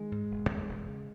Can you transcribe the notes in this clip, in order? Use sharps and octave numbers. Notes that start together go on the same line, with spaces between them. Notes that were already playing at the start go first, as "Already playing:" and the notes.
Already playing: D#3 G#3
G#2
E1
D#2
E1
C#3